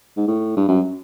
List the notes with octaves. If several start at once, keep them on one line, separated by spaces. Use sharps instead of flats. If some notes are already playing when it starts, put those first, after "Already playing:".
G#2
A2
G2
F#2